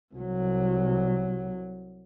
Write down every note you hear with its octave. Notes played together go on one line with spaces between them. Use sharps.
C2 F#3